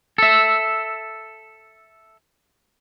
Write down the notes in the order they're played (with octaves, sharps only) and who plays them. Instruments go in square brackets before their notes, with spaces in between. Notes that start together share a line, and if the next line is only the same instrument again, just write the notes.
[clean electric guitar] A4 E5